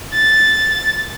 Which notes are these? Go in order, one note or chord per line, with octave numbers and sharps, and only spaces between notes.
A6